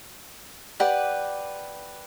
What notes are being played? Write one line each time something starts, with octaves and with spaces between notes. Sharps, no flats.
G4 B4 D5 F#5